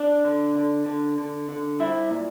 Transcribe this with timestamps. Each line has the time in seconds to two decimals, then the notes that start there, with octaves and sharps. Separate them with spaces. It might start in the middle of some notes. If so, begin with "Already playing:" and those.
Already playing: D4 D5
0.25 D3
0.55 D3
0.86 D3
1.18 D3
1.49 D3
1.80 G3 E4 E5
2.11 A#2